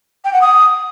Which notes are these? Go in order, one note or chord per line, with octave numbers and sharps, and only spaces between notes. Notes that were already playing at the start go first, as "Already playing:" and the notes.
G5
F#5
D#6